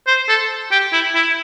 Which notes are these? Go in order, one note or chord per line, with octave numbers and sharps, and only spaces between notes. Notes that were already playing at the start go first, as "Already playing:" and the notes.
C5
A4
G4
E4
E4